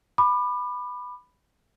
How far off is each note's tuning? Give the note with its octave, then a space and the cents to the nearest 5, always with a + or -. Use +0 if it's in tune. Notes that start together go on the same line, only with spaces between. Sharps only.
B5 +0 D6 +35